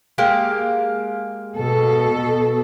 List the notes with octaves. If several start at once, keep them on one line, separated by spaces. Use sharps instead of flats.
G#3 A#3 G4
B2 A4